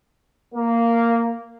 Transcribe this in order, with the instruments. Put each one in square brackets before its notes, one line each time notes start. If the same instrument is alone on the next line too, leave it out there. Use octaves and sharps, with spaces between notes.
[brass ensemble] A#3